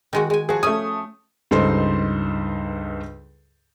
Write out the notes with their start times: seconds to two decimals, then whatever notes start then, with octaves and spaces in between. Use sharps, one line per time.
0.13 D#3 G#3 F#4
0.30 G#3 G#5
0.49 F3 F#4 G#4
0.63 A3 C#4 G#5 D#6
1.51 C#2 G2 D#4 A4 C5 C6